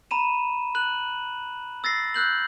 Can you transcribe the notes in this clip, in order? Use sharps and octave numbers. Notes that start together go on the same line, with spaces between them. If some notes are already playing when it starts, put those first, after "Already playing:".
A#5 B5 D#7 E7
F#6 F#7
E6 A6 A#6 C7
E6 F#6 G6 F#7